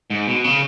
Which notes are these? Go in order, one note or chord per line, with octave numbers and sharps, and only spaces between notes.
G#2
B2
C#3